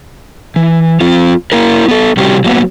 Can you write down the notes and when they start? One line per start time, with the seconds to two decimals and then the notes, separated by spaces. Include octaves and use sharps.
0.56 E3
1.01 F3 C4 F4
1.52 A#3 E4 A#4
1.88 B3 A4
2.17 C3 G3 C4 C#4 F#4 G4
2.45 F#3 A#3 B3